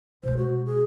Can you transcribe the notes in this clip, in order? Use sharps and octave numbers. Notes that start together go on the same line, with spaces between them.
B2 G#3 C5
F#4
G#4